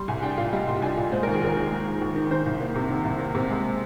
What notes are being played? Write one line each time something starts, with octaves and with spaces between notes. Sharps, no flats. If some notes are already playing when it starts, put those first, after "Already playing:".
Already playing: G3 C6
C2 G#5
D4 G5
A#2 F5
G3 D#5
C2 C6
D4 G#5
A#2
G#3 C5
D#2 A#4
G#4
D#2 A#4
D#3
G#3
D#2
D#2
D#3
D#3 C5
C2
A#3
C3
D#3
C2
A#3
C3
G#3